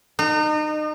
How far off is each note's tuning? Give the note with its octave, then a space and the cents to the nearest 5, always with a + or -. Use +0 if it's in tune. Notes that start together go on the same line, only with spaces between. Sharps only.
D#4 -35